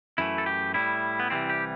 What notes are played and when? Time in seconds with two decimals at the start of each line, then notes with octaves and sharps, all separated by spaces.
0.18 F#2 E3 A3 E4
0.38 A4
0.46 G4
0.74 A2 G3 E4
1.20 B3
1.30 C2 C3 E3 G3 C4
1.50 G4